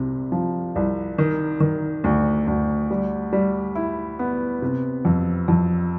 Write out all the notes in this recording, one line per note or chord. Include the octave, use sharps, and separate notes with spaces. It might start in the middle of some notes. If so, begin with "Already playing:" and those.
Already playing: C2 C3
F3
C2
D#3
D#3
D2
D2
G3
G3
E4
B3
C3
F2
F2